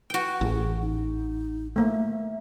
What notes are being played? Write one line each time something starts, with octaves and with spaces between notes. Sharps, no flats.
F#4 G5
A1 G#4
D#4
A3 A#3 E5